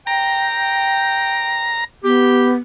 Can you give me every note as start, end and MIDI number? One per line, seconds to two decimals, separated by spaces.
0.07 1.70 79
0.07 1.84 82
2.04 2.56 59
2.04 2.55 67